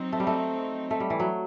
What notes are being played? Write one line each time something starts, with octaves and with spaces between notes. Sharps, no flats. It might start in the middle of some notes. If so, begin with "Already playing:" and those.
Already playing: F#3 C4 D#4
A3
G3
A3
A3
G3
E3
F#3